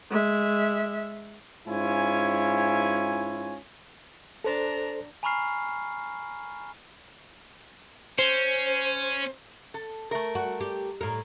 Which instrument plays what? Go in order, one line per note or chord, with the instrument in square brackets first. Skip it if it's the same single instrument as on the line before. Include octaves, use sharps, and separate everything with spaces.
[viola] G#3 E5
[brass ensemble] G#2 C#4 E4 F4 G#5
[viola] D4 A#5 [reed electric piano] A4 C5
[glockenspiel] G#5 A#5 B5 C#6 F6 C7
[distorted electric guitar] C#4 [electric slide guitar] C5
[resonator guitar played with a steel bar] A4
A3 A#4
[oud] F#4
G4
A2 A#4